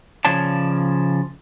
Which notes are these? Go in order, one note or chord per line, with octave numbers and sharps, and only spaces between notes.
C#3 F3 C#5 D5 A5